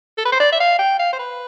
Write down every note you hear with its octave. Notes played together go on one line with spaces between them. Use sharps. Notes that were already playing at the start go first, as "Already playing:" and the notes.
A4
B4
C5
D5
E5
F5
G5
F5
C5
B4